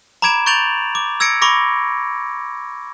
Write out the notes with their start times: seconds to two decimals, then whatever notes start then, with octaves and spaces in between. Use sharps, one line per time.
0.22 A#5 B5 D6 G#6 D7 E7
0.46 C#6 G6 A6 D7 F7 F#7
0.95 D6
1.20 E6 G#6 A#6 C#7 D7
1.42 B5 C#6 D6 A#6